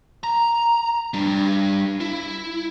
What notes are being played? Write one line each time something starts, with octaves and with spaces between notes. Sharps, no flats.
A#5
G3 D4
E4